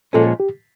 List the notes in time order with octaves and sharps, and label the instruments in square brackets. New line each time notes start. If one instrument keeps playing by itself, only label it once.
[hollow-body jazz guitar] A#2 F3 G#3 C#4 [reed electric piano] A4
[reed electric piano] G4